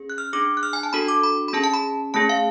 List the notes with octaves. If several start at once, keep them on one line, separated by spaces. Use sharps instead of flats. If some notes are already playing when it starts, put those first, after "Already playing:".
Already playing: C#4 G#4
F#6
F6
D4 G#4 D6
F#6
F6
G#5
A5
D4 F#4 A4 B5
D6
B5
B5
C#4 G#4 A5
A5
B5
A3 C#4 G#4 A5
F5